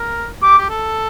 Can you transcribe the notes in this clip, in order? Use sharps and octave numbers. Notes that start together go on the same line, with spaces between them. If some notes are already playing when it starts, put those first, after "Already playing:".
Already playing: A#4
G4 D6
G4
A4